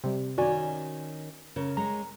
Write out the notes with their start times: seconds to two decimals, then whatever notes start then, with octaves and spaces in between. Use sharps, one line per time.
0.04 C3 G3
0.38 D#3 C#4 F#4 D5 G#5
1.56 C#3 A#4
1.77 G#3 C#5 A#5